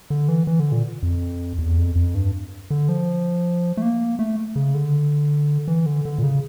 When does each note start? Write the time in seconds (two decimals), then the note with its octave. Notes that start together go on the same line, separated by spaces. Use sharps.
0.10 D3
0.28 E3
0.47 E3
0.60 D3
0.72 A#2
1.03 F2
1.59 E2
1.77 F2
1.96 F2
2.15 G2
2.71 D3
2.89 F3
3.77 A3
3.82 A#3
4.19 A3
4.56 C#3
4.74 D3
5.68 E3
5.86 D3
6.05 D3
6.19 A#2
6.23 C#3